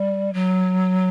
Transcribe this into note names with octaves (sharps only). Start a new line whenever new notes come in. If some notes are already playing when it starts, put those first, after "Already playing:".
Already playing: G3
F#3